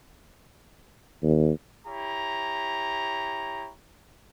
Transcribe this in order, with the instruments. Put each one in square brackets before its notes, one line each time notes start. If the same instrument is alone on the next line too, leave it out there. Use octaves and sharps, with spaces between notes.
[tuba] D#2
[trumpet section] E4 G4 C#5 A#5